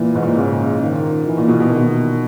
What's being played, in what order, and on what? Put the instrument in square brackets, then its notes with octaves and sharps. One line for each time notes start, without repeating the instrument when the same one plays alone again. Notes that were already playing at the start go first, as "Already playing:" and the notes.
Already playing: [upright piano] A#2 [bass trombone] E3
[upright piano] G#2
A#2
[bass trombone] C#3
D#3
E3
[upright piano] A#2
B2
B2
[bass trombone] D#3